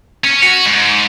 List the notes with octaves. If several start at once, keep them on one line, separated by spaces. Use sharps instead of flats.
C#4
F#4
G#2